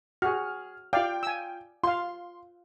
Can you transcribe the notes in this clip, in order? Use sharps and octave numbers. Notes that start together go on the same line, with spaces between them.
F#4 G#4 F6
F4 D5 F5 G5
G#5 E6
F4 F5 C6